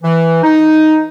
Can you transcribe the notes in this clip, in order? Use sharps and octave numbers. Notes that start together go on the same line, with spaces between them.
E3
D#4